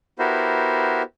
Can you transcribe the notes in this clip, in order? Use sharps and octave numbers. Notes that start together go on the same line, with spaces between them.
B3 E4 F#4 G4 A#4 C5